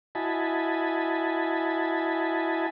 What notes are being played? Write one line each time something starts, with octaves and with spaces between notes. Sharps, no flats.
E4 F#4 D#5 G#5 A5 B5